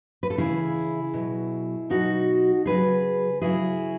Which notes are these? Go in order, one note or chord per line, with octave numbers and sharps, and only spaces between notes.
B4
A4
C#3 E3 E4 G#4
B2 F#3
B2 F#3 D#4 F#4
C#3 F#3 G#4 B4
C#3 F#3 E4 G#4